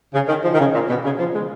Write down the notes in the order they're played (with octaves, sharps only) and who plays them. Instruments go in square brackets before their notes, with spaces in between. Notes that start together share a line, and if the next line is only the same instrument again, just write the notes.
[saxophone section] C#3
D#3
F3
D#3
C#3
A#2
B2
C#3
F3
G#3